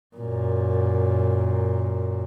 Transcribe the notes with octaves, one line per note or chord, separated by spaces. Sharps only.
F#2 A#2